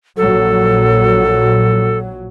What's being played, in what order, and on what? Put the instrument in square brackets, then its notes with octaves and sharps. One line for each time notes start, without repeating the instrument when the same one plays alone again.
[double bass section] A#1 F#3 [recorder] A4